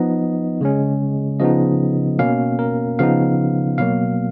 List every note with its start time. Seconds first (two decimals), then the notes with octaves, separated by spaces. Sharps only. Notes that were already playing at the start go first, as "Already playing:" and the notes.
Already playing: F3 B3 D#4 D#5
0.61 C#3 G#3 C#4
1.40 C#3 F3 B3 D#4 D#5
2.19 B2 A#3 C#4 F5
2.59 A#4
2.99 C#3 F3 B3 D#4 F5
3.78 B2 F#3 A#3 F5